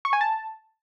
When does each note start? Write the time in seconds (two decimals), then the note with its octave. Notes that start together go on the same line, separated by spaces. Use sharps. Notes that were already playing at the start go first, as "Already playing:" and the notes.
0.05 C#6
0.13 G#5
0.21 A5